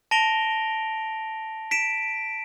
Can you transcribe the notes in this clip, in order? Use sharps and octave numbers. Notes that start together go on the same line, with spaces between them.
A5 A#6 D7 F7 G7
B6 D7 E7